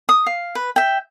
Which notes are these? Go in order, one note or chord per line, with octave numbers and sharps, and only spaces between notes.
D#6
F5
B4
E5 G5